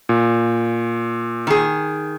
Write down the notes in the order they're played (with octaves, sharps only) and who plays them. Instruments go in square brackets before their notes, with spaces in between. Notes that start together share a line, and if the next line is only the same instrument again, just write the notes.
[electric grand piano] A#2
[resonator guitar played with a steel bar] D#3 G#4